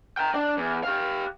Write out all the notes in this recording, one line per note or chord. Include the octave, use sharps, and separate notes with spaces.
G5 A#5
D4 D5
E2
G4 F5